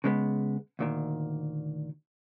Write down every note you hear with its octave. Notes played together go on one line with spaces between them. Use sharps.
C#3 G#3 B3
D2 A#2 D#3